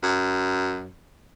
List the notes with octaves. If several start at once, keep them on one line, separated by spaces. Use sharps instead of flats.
F#2